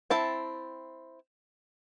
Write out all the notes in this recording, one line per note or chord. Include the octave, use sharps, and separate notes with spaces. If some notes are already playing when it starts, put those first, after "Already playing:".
C4 E4 A5